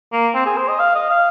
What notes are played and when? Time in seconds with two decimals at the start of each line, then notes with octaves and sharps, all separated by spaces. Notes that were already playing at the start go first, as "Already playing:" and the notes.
0.12 A#3
0.34 C4
0.46 G#4
0.57 C5
0.68 D#5
0.80 F5
0.95 D#5
1.10 F5